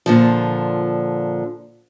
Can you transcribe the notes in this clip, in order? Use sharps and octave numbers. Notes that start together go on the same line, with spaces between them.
A#2 D3 F3